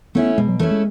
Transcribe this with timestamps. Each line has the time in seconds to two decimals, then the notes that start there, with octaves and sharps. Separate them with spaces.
0.15 A3 B3 C#4 E4
0.38 B2 G#3
0.48 F#3
0.59 E3 A3 C#4 E4
0.71 G#3